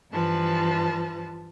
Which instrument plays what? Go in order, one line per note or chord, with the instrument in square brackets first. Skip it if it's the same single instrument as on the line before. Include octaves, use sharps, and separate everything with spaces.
[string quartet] G2 E3 F3 B4 A5